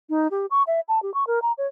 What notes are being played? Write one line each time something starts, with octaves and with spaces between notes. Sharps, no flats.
D#4
G4
C#6
E5
A5
G4
C#6
A#4
A#5
C#5